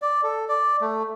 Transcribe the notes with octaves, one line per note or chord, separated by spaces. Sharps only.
D5
A4
D5
A3